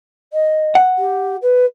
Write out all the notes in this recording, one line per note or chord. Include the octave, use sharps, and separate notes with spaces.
D#5
F#5
G4
B4